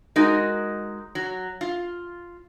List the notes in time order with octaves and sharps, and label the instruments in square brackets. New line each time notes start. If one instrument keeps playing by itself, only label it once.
[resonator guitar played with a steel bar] G#3 D#4 F#4 A#4
F#3
F4